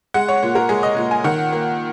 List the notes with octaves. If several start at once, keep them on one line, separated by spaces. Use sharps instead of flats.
G#3 F#5
C#5
A#2
A#4
G#3 G#4
D#5
A#2
G#5
D#3 F#5
A#3